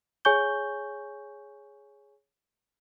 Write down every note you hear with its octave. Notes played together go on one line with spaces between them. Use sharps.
G#4 C#5 G#5 C#6 G6 G7